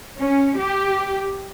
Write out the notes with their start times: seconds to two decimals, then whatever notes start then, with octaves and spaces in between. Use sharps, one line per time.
0.19 C#4
0.57 G4